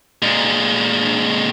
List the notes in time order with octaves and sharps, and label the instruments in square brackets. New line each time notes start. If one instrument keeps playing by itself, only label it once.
[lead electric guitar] A#2 G#3